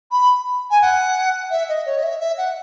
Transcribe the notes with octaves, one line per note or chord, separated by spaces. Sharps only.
B5
G#5
F#5
E5
D#5
C#5
D#5
E5
E5
F#5